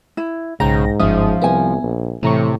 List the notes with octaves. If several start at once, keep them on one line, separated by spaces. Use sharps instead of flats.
E4
B1 G#2 C#3 G5 A#5 A#6
G1 F3 C#4 E5 D#6
C2 B3 E5 G#5
A#1
A2 C3 E3 A#5 C#6